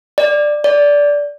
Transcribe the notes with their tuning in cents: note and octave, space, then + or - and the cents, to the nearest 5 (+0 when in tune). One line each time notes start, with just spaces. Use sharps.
D5 +10
D5 -15